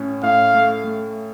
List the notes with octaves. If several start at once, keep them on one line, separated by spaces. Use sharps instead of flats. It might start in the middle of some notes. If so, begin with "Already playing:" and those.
Already playing: A2 A3 C#4
A2 F5
A3
A3